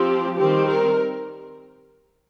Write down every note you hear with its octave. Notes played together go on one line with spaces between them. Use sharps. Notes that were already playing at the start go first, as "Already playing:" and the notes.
Already playing: F3 C4 G4
D#3 G3 C4 G4
A#4